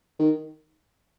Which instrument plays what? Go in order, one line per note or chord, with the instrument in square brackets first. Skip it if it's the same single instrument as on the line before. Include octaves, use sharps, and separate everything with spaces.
[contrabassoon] D#3